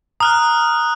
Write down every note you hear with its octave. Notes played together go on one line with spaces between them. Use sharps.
A#5 D#6 F6 F#6